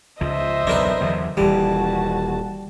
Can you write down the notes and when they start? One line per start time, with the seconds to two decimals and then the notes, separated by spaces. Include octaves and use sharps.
0.21 C#2 F3 C5 D#5 E5
0.67 F#1 B1 E2 D4 A#4 B4
1.01 E2 D3 F#3
1.37 D#1 E3 G3 F#4 A5